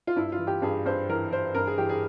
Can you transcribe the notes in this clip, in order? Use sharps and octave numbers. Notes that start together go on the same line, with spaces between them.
F4
G2 E4
F4
E3
G4
G2 G#4
G2 C5
E3 A#4
E3 C5
G2 A#4
G#4
E3 G4
G#4